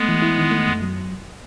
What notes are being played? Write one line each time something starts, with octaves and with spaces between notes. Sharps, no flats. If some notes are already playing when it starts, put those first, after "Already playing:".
Already playing: G#3 A3 B3
E3
E4
D#3
A3
F#2
F#3